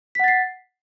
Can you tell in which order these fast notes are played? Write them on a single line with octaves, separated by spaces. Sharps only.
B6 F#5 A6 C7